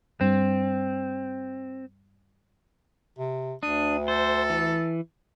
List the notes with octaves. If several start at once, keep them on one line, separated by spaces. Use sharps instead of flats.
G2 C4
C3
D2 D4 D#6
A4 C5
E3